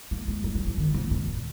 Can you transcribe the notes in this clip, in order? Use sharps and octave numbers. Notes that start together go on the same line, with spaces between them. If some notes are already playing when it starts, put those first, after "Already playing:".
A#3
G#3
F#3
F#3
F3
D#3
C3
A#2